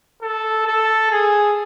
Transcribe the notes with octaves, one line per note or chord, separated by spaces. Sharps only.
A4
A4
G#4